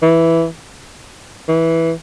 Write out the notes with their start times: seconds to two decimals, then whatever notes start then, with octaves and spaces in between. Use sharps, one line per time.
0.02 E3
1.48 E3